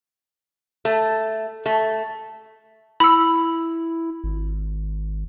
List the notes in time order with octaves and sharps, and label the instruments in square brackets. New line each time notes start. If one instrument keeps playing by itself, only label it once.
[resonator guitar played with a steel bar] A3
A3
[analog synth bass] E4 [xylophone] B5 E6
[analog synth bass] G#1